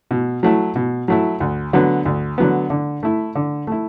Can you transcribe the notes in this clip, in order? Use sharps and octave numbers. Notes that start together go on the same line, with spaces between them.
B2
F#3 A3 E4
B2
F#3 A3 E4
D2
D3 F#3 B3
D2
D3 F#3 B3
D3
A3 E4
D3
A3 E4